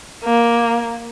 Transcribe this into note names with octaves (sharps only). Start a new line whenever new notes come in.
A#3